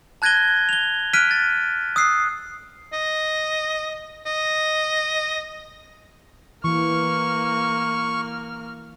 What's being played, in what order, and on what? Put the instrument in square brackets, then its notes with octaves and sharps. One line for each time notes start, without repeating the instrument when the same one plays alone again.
[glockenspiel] A5 F#6 G#6 A#6 D#7 G7
F7 G7
F6 F#6 B6 D7 D#7
A6
D#6 E6 F#6 C7
[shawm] D#5
D#5
[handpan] E3 [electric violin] A#3 F6 [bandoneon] C#6